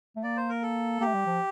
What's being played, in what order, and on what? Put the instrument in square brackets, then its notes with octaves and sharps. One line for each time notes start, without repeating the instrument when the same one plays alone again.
[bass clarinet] A3
[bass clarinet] A#3 [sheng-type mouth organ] D5
[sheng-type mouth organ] C5
A#4
A4
[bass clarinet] A#3 [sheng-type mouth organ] G4
[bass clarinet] A3
G3
F3